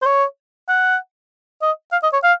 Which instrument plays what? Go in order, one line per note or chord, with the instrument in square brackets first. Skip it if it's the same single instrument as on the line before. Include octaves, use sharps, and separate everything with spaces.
[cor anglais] C5
C#5
F#5
D#5
F5
D#5
C#5
F5